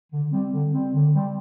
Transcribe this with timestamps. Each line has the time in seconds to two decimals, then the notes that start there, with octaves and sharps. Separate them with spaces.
0.11 D3
0.32 G3 C4
0.53 D3
0.73 G3 C4
0.93 D3
1.13 G3 C4